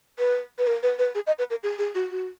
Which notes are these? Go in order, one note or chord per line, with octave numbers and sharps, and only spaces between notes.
B4
B4
A#4
B4
B4
G#4
D#5
B4
A#4
G#4
G#4
F#4
F#4